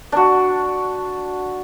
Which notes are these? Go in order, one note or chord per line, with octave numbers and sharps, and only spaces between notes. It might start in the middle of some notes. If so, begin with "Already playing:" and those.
D4 F#4